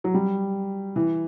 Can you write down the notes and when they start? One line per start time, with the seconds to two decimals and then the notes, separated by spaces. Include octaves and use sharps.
0.04 F#3
0.14 G3
0.96 E3